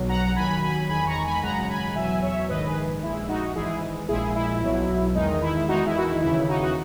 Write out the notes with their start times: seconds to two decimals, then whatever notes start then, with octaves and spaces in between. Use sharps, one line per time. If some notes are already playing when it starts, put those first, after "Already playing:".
Already playing: B1 B2 F#3
0.09 F#5 A#5
0.36 D#2 D#3 F#3 G#5 B5
0.62 G#5 B5
0.89 E2 D#3 G#3 G#5 B5
1.07 A#5 C#6
1.24 G#5 B5
1.42 G#1 F#2 C#3 G#3 F#5 A#5
1.69 G#5 B5
1.95 E2 B2 F#3 E5 G#5
2.22 C#5 E5
2.49 A#1 G#2 D#3 B4 D#5
2.66 G#4 B4
3.02 A#1 A#2 G#3 E4
3.28 D#4 F#4
3.55 G#1 G#2 E3 G#3 E4 G#4
4.08 A#1 A#2 G#3 E4 G#4
4.35 E4
4.62 B1 B2 F#3
5.15 E2 D#3 G#3 D#4
5.42 E4
5.68 E2 D#3 G#3 D#4 F#4
5.86 E4
5.98 F#4
6.04 E4
6.22 D#2 C#3 E3 E4
6.48 D#4 F#4
6.62 F#4